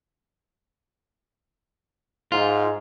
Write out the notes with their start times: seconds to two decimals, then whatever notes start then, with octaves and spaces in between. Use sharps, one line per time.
2.32 G#2 F4